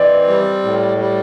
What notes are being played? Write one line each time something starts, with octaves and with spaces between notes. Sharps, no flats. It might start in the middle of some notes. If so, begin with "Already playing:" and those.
Already playing: E3 C4 D5 D#5
G3
A2
G3